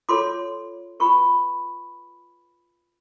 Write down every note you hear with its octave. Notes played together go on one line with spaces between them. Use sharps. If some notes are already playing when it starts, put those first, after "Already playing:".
F4 A4 C#5 C6 D6
F4 G#4 B4 B5 C#6